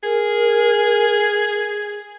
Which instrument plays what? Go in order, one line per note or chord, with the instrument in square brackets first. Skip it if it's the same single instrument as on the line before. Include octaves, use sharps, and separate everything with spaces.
[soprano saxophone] G#4 [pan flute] A#4